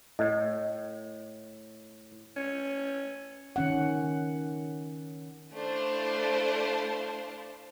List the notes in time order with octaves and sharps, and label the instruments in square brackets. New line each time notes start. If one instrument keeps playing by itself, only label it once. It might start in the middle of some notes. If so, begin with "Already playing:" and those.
[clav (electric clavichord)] A2 [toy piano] D#5
[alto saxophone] C#4
[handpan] D#3 C#4 F#5
[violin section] A3 D4 E4 C5 F5 A5